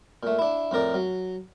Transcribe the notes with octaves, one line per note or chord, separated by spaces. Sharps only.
A#2 A3
D4 E4
F2 A2 A#4 D5
F#3